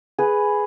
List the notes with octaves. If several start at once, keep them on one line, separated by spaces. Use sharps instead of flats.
G#4 B4